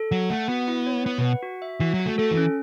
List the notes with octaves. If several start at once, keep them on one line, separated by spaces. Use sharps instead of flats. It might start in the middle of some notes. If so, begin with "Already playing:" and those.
Already playing: A4
F#3 F#5
A3 F#5
B3 F#4
E4
C#5
B3 B4
B2
F#5
F#4
E5
E3 F#4
F#3
F#4
A3
A3 A4
E3
C#4